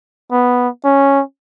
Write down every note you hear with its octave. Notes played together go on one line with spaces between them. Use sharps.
B3
C#4